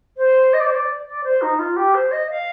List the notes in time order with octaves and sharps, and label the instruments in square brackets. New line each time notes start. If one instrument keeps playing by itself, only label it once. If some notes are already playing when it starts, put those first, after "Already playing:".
[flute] C5
D#5
D5
C5
D5
D5
C5
D#4
F4
G4
C5
D#5
F5